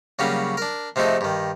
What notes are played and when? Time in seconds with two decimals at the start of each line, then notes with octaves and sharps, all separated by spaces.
0.19 C#3 F#3 G3 A#3 C#4
0.57 D4 A#4
0.96 C3 F3 G#3 A3 D#4
1.21 G2 D#3